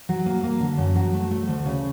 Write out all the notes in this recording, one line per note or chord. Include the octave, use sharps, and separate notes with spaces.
F#3
A#3
A#3
D3
F#2
F#3
A3
A3
D2
C#3